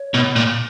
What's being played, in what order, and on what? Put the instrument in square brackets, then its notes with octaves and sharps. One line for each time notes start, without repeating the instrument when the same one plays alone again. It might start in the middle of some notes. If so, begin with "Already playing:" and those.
Already playing: [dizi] C#5
[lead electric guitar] B2
A#2